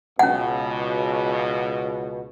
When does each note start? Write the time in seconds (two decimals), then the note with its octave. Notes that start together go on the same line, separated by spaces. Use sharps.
0.19 C#2 B2 C#4 F#5